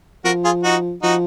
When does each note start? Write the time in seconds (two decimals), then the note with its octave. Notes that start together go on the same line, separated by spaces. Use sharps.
0.25 F3 F#4 A#4
0.44 F4 G#4
0.63 D#4 F#4
1.03 F3 D#4 F#4